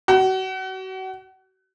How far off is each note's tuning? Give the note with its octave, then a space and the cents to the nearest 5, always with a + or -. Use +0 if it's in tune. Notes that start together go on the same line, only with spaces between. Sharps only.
F#4 +35